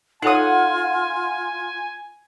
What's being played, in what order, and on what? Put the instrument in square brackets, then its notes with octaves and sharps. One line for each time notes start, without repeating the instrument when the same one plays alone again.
[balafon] D#4 A4 C#5 [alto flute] F4 [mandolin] F#5 D#6 [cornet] G#5